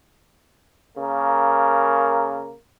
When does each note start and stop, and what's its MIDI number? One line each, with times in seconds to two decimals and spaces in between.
0.98 2.52 49
0.98 2.52 58
0.98 2.52 70